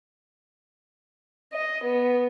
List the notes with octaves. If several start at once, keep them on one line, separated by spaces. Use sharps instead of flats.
D#5
B3